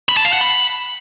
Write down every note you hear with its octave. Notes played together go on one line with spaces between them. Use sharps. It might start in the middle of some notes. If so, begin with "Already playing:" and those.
B5
A5
F5
F#5
B5